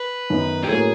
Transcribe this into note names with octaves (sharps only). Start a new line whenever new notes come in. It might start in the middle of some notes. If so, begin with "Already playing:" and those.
Already playing: B4
F#2 D#3 F#3 B3 D#4
G4
A2 F#3 A#3 C#4 F#4 G#4